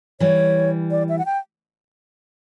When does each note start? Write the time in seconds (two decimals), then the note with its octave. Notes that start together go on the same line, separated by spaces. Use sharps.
0.20 E3 G3 C#5
0.91 D5
1.09 E5
1.19 F#5
1.26 G5